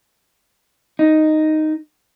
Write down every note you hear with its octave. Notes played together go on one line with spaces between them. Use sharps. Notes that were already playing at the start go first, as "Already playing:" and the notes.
D#4